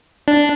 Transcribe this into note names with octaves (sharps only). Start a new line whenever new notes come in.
D4